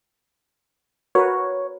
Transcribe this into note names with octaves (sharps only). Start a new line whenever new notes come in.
F#4 A#4 B4 C#5